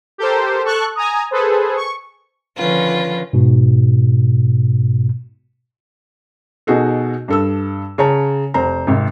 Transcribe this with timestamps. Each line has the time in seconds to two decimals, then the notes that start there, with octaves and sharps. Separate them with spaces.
0.18 G4 A4 A#4 C5
0.65 A4 A5 C#6 F#6
0.95 G#5 A#5 D#6
1.31 G#4 A4 B4 C5
1.77 C#6
2.56 D3 D#3 F3 C#4 F4 B4
3.33 G#2 B2
6.67 B2 D#4 F#4 G#4 A4
7.28 G2 A4 E6
7.98 C#3 C#5 A5 A#5
8.54 F1 C5 A#5
8.87 G#1 C3